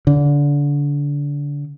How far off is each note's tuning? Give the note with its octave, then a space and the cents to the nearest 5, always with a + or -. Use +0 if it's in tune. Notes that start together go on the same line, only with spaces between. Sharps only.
D3 -25